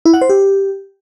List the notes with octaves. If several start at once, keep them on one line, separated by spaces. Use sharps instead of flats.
E4
F#5
C5
G4